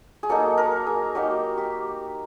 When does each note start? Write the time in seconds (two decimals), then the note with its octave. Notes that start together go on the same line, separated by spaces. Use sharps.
0.23 G#4
0.29 F#3 A#3 D#4 A4
0.58 A#4
0.87 G#4
1.15 F#3 A#3 D#4 G4
1.57 G4